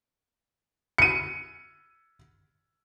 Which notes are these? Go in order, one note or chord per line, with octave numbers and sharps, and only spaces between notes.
C#7 D#7